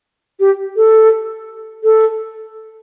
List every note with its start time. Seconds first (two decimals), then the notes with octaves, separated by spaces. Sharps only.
0.40 G4
0.76 A4
1.84 A4